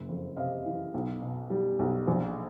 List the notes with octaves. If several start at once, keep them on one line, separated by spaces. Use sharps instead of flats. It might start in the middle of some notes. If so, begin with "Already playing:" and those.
Already playing: F#1
F2
C3 D#5 F5
E3
B1
B2
G3
B1
A#1